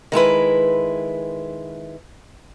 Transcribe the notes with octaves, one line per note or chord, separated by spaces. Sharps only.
D#3 G#3 E4 B4